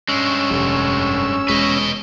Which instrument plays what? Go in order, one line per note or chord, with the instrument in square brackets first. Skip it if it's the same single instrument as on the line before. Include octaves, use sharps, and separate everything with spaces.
[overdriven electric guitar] G2 G#3 [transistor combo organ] C#4 E6
[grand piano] F1
[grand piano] E1 G#3 [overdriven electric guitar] B4 D#5